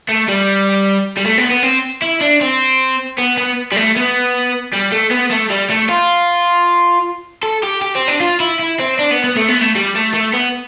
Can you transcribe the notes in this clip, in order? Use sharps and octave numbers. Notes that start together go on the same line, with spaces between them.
A3
G3
G3
A3
B3
B3
C4
E4
D4
C4
B3
B3
G3
A3
B3
G3
A3
B3
A3
G3
A3
F4
A4
G4
G4
C4
D4
F4
E4
E4
C4
D4
B3
B3
A3
B3
A3
G3
A3
A3
B3